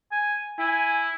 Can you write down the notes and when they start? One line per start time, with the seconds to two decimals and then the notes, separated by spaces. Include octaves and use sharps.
0.12 G#5
0.58 E4 G#5